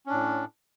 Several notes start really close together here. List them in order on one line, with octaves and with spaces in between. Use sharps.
C#4 D4 A2